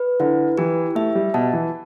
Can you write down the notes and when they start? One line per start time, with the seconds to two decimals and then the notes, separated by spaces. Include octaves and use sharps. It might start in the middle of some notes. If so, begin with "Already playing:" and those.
Already playing: B4
0.20 D3 E4
0.57 E3 G4
0.95 A3 E5
1.15 G3
1.34 B2 A5
1.53 E3